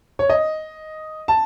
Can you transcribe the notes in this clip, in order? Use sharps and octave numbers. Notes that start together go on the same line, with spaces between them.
C#5
D#5
A5